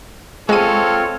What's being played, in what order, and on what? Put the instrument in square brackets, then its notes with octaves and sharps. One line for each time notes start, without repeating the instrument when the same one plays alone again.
[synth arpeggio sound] G#3 D#7 [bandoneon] C4 F4 [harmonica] A4 F6 [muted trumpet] C#5